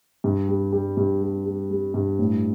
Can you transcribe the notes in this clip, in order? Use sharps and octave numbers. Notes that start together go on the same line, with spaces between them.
G2
G3
G3
G2
G3
G3
G3
G2
A2